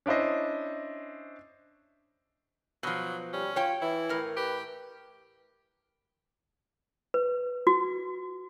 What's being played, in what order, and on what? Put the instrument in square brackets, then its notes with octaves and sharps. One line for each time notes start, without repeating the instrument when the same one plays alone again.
[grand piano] C#4 D4 E4 C5 D#5
[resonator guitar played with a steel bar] B2 F3 [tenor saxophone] F#3
[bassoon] G3 [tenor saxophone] C#4
[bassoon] F4 [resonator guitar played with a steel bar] C#5 G5
[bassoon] E3 [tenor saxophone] E4
[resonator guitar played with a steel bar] A2 A#4
[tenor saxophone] G4 [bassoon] B4
[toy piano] B4
F#4